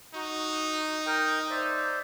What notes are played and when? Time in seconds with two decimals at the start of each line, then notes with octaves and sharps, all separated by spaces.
0.15 D#4 F#4
1.06 A#4 D#5 G5
1.50 C5 D5 E5